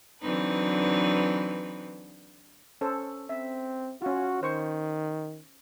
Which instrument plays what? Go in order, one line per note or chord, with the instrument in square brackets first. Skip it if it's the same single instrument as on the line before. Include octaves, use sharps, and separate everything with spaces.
[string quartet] D3 E3 F#3 C4 D#4 B4
[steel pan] C#4 A4 C5
[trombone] C4 [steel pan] E5
[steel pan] C#4 F4 [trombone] F#4
[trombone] D#3 [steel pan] C5 C#6